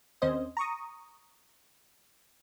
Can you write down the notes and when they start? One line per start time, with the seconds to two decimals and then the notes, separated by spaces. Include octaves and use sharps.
0.22 D#2 C4 C#4 C5 D#5
0.57 A#5 C#6 D#6